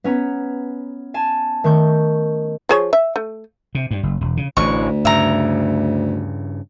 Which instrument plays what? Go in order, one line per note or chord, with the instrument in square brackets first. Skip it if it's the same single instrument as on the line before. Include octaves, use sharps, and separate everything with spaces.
[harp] B3 C#4 A#5
G#5 A5
D#3 A3 C#6 G6
[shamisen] F3 G#4 C#5
E5
A3
[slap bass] C3
G2
F#1
E1
C#3
[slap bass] A1 E3 [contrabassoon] D2 [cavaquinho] C#6
[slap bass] G2 C#3 [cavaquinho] E5 A#5